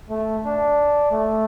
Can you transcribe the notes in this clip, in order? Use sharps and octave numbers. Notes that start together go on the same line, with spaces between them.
A3
D4
A3